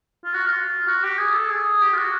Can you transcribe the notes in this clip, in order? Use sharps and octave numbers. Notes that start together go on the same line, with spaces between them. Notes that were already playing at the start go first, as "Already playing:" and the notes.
F4
F#4
F4
F#4
G4
G#4
A4
G#4
G4
F4
F#4